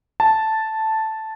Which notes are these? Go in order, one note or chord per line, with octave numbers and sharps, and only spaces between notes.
A5